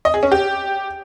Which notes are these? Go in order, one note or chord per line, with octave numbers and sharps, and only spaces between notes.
D#5
G#4
C#4
G4